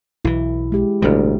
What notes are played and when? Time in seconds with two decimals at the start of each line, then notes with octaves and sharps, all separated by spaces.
0.25 B1 E3 E4
0.72 G#3 G4
1.02 A1 D2 B2 G3